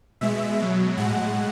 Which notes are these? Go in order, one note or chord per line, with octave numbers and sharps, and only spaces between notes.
B2 G#3 E5
B2 F#3
A2 G#3 F#5